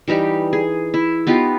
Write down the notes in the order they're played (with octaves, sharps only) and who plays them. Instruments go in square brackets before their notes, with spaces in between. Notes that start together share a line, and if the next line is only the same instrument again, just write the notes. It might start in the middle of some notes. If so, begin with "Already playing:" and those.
[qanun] E3 G3 D#4 G4
G#4
E4
B3 D#4 F4 G4